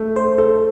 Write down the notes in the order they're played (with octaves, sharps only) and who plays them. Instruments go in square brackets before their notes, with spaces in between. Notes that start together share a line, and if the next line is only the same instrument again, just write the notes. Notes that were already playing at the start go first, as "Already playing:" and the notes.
Already playing: [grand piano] A3 A4
[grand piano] A4 [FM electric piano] C5
[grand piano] A4